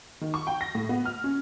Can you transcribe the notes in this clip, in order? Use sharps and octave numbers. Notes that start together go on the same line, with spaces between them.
D#3
C#6
G5
A#6
A2
B3
F6
C#4